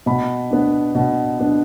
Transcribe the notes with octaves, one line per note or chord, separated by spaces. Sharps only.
B2 B5
B3 D4
B2
B3 D4